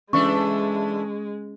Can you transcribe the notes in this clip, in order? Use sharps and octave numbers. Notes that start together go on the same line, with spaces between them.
E3 G#3 A3 C#4 D4 C#6